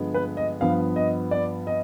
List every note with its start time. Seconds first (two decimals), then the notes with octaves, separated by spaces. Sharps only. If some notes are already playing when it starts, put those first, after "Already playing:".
Already playing: G2 D3 F3 G#3 B3
0.14 B4
0.37 D#5
0.61 G2 F3 B3 F5
0.96 D#5
1.31 D5
1.67 D#5